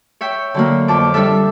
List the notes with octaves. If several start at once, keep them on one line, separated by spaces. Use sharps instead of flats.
C#5 E5 G5
D3 F#3 A#3
F2 A5 D6
G3 D4 A4 E5